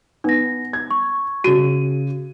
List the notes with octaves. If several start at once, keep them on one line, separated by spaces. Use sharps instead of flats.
B3 D#4 A#6
G#6
C#6
C#3 F#4 D#7